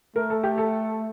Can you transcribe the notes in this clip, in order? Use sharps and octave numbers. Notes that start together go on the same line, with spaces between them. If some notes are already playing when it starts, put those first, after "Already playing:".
A3 A#4
A4
G4
A4